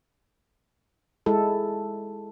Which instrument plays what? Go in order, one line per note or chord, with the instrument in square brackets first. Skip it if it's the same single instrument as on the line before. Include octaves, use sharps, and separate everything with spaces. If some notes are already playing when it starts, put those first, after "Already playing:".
[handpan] G#3 E4 A4